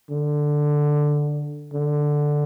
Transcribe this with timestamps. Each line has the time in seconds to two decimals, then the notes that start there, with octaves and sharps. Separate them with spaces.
0.10 D3
1.73 D3